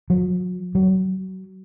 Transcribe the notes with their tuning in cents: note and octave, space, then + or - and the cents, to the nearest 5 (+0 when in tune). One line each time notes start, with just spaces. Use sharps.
F#3 -40
F#3 +25